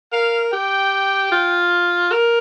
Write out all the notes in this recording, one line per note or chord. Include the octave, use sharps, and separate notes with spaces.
A#4 F5
G4 G5
F4
A#4